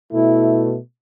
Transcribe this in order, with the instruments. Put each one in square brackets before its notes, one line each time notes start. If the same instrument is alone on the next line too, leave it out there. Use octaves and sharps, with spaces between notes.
[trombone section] B2 A3 E4